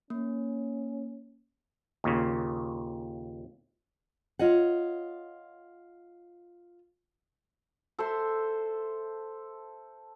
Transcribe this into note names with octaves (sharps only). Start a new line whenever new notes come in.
A#3 C#4
D#2 A#2 C#3
F4 C#5 D#5 F#5
A4 C5 E5 C6